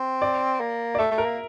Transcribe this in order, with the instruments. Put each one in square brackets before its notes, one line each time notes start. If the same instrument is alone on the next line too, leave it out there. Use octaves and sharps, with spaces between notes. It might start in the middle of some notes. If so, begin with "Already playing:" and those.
Already playing: [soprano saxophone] C4
[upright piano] D5
[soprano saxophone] A#3
[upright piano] D5
[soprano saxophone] A3 [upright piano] E5
[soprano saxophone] A3
[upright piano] A#4
[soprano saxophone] A#3